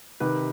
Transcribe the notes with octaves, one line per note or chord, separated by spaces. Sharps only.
C3 D#3 B4